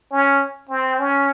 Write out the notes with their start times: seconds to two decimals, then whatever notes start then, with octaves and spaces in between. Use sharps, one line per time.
0.11 C#4
0.69 C4
0.99 C#4